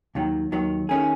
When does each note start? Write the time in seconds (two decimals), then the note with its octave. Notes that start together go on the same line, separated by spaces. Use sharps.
0.15 D#2 D#3 F#3
0.52 D#2 D#3 F#3
0.89 D#3 A3 C#4 G#4